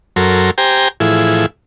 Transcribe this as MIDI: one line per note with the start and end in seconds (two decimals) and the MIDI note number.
0.16 0.51 42
0.16 0.51 54
0.16 0.51 69
0.16 0.51 70
0.16 0.51 84
0.58 0.88 67
0.58 0.88 72
0.58 0.88 79
0.58 0.88 80
0.58 0.88 82
1.00 1.46 45
1.00 1.46 52
1.00 1.46 53
1.00 1.46 64
1.00 1.46 68